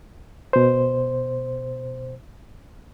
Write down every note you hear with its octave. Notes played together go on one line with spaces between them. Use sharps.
B2 C5